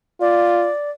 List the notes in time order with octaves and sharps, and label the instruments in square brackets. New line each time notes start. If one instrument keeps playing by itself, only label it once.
[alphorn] F4 [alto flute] D5